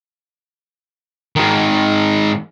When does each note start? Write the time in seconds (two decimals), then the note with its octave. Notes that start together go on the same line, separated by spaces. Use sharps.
1.36 G#2 D#3